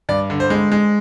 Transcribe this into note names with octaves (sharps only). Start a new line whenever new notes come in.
G2 D5
D3
C5
G#3
G#3